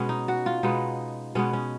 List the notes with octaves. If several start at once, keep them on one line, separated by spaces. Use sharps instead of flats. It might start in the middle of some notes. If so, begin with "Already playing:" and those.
Already playing: B2 G#3 B3 C#4
D#4
F#4
F4
B2 G#3 B3 D#4
B2 G#3 B3 C#4
C#4